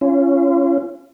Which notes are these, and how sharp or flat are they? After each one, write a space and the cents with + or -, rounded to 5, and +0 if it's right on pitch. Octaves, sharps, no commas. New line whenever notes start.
C#4 +0 F4 -35